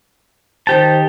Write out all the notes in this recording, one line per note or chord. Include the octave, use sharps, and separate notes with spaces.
D#3 G4 C5 A5